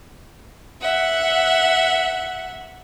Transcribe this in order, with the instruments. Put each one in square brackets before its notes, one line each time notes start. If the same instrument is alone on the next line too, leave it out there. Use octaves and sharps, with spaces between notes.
[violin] E5 F#5